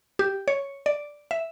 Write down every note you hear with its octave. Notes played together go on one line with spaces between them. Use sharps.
G4
C#5
D5
E5